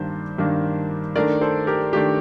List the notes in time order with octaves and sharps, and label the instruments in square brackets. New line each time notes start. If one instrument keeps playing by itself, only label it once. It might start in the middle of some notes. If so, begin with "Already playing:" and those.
Already playing: [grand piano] G2 D#3 A#3 D4 C5
G2 D#3 A#3 D4
D#3 A3 D4 A#4 D5
A4 C5
G4 A#4
D#3 A3 D4 G4